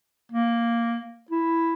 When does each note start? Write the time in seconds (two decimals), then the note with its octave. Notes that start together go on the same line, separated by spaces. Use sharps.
0.32 A#3
1.31 E4